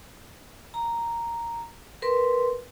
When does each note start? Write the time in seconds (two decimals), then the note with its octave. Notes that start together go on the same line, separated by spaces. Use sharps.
0.74 A#5
2.02 A#4 B4 C6